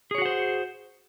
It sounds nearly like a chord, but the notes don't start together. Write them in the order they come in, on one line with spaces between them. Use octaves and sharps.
G#4 C#5 F#4 F#5 C5